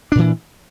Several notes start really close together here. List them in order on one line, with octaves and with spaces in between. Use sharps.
D4 A#2 E3